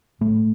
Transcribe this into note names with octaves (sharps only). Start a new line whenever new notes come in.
A2 A3